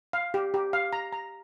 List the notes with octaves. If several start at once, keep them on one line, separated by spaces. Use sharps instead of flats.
F5
G4
G4
F5
A#5
A#5